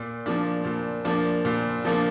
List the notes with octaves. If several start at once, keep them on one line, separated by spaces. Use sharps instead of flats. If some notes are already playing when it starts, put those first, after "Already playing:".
Already playing: A#2
F3 A#3 D4
A#2
F3 A#3 D4
A#2
F3 A#3 D4